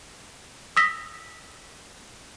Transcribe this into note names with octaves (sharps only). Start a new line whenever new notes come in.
D#6 E6 A#6 B6